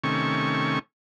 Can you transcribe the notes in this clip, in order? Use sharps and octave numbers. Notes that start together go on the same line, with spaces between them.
C3 D#3 A3 C#4 C#6